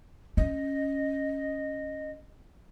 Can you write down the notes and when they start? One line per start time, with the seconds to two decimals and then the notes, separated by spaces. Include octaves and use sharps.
0.37 C#4 D#5